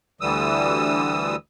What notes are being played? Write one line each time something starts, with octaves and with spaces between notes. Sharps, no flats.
D2 D3 E3 G3 D#6 E6